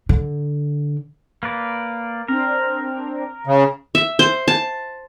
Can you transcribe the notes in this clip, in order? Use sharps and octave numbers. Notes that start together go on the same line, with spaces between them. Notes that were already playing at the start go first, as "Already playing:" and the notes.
D3
A#3 B4 D5
C4 D4 A#4
C#3
E5
C5
A5